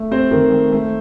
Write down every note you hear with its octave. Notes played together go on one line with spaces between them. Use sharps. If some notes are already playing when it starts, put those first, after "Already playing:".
Already playing: A3
C4 C5
D#3
A3
A3